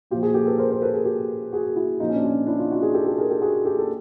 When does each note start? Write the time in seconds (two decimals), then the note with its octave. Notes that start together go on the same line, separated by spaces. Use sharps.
0.11 A#2 F4 G4
0.14 F3
0.22 F#4 G#4
0.34 G4 A4
0.47 A4 B4
0.58 A#4 C5
0.70 A#4 C5
0.82 A4 B4
0.94 G#4 A#4
1.05 G4 A4
1.52 F#4 G#4
1.76 E4 F#4
2.00 A#2 F3 D#4 F4
2.09 C#4
2.16 D4
2.24 C#4 D#4
2.47 D4 E4
2.59 D#4 F4
2.71 E4 F#4
2.82 F#4 G#4
2.94 G4 A4
3.06 G4 A4
3.18 G#4 A#4
3.30 G4 A4
3.42 F#4 G#4
3.65 G4 A4
3.79 A4